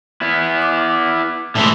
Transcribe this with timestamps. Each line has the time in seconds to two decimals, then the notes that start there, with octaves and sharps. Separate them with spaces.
0.21 B3 E4
0.62 D6
1.55 A2 D3 E3 G#3 A3